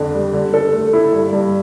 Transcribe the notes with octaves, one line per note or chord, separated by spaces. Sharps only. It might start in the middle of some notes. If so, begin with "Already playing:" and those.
Already playing: F2 D3 D4
G3
D3
A4
A3
E4
G2
G2